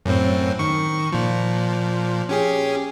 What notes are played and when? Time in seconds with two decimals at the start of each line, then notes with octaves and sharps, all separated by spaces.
0.06 F#2 A2 C4
0.59 D#3 C#6
1.12 A#2 F3
2.29 C#4 G4 G#4